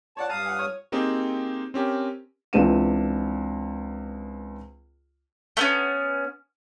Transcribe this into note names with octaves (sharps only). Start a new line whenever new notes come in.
C#5 D5 F#5 A5
G2 F5 A5 A#5 D#6
F#5 G#5
C#5
A#3 C4 D#4 G4 G#4 C5
C4 C#4 G4 A#4
C#2 E3 C4 D4 D#7 E7
A3 B3 C#4